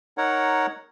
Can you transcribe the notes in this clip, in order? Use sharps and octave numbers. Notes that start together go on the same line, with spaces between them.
D#4 A#4 C#5 F#5